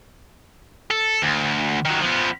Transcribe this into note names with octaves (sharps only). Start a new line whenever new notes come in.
A4
D2
D#3 F#3
F3 B3